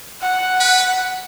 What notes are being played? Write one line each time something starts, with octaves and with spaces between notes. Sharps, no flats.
F#5
B4